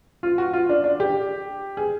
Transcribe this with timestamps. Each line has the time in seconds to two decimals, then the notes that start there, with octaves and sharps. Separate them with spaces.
0.23 F4
0.38 F#4
0.53 F4
0.69 D4
0.84 D4
1.00 G4
1.77 G#4